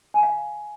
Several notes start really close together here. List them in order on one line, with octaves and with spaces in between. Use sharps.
G#5 A#5 F5